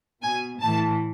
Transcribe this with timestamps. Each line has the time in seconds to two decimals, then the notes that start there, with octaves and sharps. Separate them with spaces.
0.23 B2 G#5
0.61 A2 E3 A5